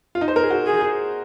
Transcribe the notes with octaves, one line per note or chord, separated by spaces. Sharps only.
F4
D#4
C5
A#4
G#4
F#4
G#4
G#4